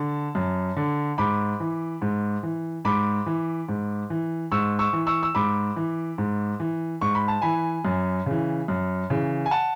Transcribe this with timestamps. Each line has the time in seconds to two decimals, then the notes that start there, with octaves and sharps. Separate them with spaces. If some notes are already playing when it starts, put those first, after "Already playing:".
Already playing: D3 A5
0.35 F#2
0.77 D3
1.18 G#2 B5 D6
1.60 E3
2.02 G#2
2.43 E3
2.85 G#2 B5 D6
3.26 E3
3.68 G#2
4.10 E3
4.52 G#2 C#6 E6
4.79 C#6 E6
4.93 E3
5.07 C#6 E6
5.23 E6
5.35 G#2 B5 D6
5.76 E3
6.18 G#2
6.60 E3
7.01 G#2 C#6
7.15 B5
7.28 A5
7.42 E3 G#5 B5
7.85 F#2
8.26 C#3 E3
8.68 F#2
9.10 C#3 E3
9.46 G#5
9.51 F#5 A5